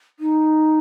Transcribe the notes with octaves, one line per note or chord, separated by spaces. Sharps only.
D#4